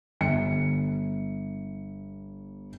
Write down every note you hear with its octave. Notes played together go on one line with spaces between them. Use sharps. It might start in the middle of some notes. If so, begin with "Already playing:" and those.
G1 C#7